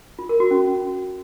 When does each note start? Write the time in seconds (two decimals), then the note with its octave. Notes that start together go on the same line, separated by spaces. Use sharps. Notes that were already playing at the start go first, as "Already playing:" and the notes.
0.19 F4
0.29 A#4
0.40 F#4
0.51 C#4